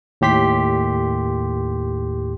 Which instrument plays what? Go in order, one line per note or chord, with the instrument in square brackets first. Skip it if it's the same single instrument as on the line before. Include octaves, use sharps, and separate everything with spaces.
[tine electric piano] D#2 A2 G4 C6 B6